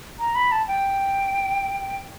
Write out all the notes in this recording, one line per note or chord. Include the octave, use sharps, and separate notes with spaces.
A#5
B5
A5
G5